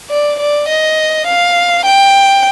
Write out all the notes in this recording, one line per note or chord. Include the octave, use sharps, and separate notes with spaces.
D5
D5
D#5
F5
G5